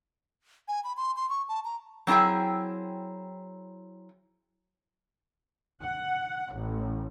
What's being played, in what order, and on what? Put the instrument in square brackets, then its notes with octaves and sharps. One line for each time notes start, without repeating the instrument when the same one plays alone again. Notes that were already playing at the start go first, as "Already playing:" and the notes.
[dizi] G#5
B5
C6
C6
C#6
A5
A#5
[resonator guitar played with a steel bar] F#3 C4 E4 G#4 G5
[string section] F#5
A1